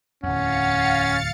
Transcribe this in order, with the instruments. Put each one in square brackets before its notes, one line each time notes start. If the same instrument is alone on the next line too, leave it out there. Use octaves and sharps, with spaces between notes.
[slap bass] D1 E2 [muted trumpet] C#4 [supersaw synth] F5 A6 C#7 [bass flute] F#5